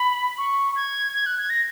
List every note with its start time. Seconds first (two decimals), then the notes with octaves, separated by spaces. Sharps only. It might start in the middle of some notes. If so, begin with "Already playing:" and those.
Already playing: B5
0.38 C#6
0.76 G#6
1.13 G#6
1.26 F#6
1.38 G#6
1.50 A#6